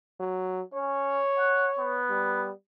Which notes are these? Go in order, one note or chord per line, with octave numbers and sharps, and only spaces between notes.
F#3
C#4 C#5
F#5
B3
G3